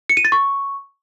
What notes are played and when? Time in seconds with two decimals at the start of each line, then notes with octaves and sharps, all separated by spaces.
0.09 C#7
0.17 D#7
0.25 A6
0.32 C#6